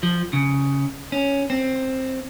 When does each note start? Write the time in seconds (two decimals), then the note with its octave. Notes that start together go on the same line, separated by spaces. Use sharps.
0.03 F3
0.33 C#3
1.12 C#4
1.50 C4